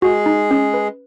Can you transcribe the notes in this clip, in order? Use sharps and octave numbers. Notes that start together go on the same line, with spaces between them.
G#3 F#4 G#4
D#4
C#4
B4